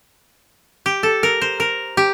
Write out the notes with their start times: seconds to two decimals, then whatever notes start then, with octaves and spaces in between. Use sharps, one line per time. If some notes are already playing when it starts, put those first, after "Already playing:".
0.86 G4
1.03 A4
1.23 A#4
1.41 C5
1.60 A#4
1.97 G4